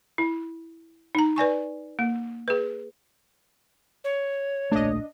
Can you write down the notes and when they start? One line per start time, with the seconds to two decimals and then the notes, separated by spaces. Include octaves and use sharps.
0.18 E4
1.15 D#4 A#5
1.36 B4 D5 G#5 C#6
1.99 A#3
2.48 G#4 B4
4.04 C#5
4.71 D1 A#1 A3 D4 D#5